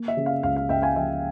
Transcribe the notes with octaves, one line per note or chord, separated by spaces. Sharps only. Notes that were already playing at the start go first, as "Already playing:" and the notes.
Already playing: A#3
E5
C#3
F5
C#2 F5
F5
C#2 E5 G5
F5 G#5
F3 E5 G5